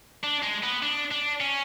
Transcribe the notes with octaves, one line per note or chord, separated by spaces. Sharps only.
D4
G#3
B3
D4
D4
C#4